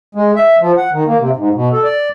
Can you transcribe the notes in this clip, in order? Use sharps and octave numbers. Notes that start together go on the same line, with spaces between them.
G#3
E5
F3
F#5
D#3
A#3
C3
G#2
B2
A4
D5